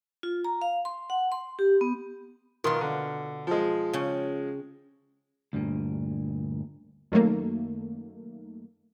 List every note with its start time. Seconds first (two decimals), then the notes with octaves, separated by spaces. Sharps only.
0.23 F4
0.45 A#5
0.62 F5
0.85 C6
1.10 F#5
1.32 C6
1.59 G4
1.81 B3
2.64 B2 D#3 F4 C6
2.81 D3
3.47 F3 G#3
3.93 C#3 C#4 G5
5.53 D2 G2 A#2
7.12 F#2 D#3 F#3 A3 A#3